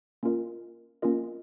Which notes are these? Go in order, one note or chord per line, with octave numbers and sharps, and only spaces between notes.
A#3 C#4 F4 A#4 D#5
A#3 C#4 F4 A#4 D#5